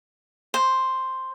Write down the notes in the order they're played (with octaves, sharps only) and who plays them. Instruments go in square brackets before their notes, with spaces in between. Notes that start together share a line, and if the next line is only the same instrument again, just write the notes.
[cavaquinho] C5